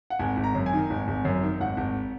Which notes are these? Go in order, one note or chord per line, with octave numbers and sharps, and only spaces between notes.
F#5
G#1 G#5
G#1
A#5
F#2
G#5
D#3
G#1
G#1
F#2
D#3
G#1 F#5
G#1